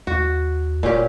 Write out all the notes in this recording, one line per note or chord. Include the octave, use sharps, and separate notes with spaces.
D#2 F#4
E1 A#2 C#4 G4